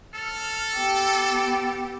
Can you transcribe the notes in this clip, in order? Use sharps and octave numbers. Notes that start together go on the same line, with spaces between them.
A4 F6
B3 G4